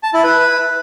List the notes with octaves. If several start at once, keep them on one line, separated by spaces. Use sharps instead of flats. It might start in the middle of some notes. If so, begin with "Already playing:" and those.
A5
E4
B4